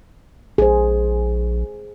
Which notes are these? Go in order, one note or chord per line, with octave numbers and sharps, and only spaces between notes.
A#1 G#4 C5